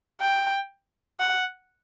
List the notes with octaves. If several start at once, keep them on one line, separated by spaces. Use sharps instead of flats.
G5
F#5